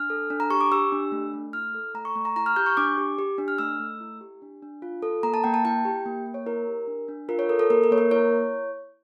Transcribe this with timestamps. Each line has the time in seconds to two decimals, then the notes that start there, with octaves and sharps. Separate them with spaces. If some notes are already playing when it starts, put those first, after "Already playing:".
Already playing: D4 F6
0.10 A4
0.30 D4
0.40 A#5
0.50 G4 C#6
0.61 D6
0.71 G4 E6
0.92 D4
1.12 A3
1.33 A3
1.53 E4 F6
1.75 A4
1.94 A3 A#5
2.05 C#6
2.15 A3 C#6
2.25 A#5
2.36 E4 A#5
2.46 F6
2.56 G4 G6
2.66 C#6
2.77 D4 D6
2.97 G4
3.19 G4
3.38 D4
3.48 F6
3.59 A3 E6
3.80 A3
4.00 E4
4.21 G4
4.42 D4
4.62 D4
4.82 F4
5.02 A4
5.23 A#3 A#5
5.34 A5
5.44 A#3 G5
5.54 A5
5.65 E4 G5
5.85 G4
6.06 A#3
6.26 A#3
6.34 C#5
6.46 E4 A#4
6.67 G4
6.87 D4
7.08 D4
7.29 F4 A#4
7.39 C#5
7.49 A4 A#4
7.59 A4
7.70 A#3 A#4
7.84 A#4
7.91 A#3 C#5
7.98 A#4
8.11 E4 C#5